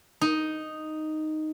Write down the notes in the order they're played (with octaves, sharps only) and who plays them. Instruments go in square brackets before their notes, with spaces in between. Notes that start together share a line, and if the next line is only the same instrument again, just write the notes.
[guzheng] D#4